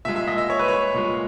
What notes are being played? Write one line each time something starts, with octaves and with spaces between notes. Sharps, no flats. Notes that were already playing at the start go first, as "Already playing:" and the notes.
A#2 G#3 E5
E5
D#5
E5
C#5
B4
C#5
A#2 G#3